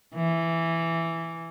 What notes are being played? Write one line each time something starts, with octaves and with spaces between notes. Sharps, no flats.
E3